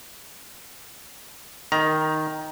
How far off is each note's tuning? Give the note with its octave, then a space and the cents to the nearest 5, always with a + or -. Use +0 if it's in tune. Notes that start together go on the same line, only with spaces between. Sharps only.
D#3 +0 A#5 +20